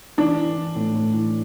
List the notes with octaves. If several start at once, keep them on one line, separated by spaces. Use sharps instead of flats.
E3 D4
E3
E3
A2
A2
E3